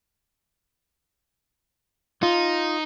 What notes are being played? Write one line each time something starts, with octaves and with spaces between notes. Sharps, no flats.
D#4 F4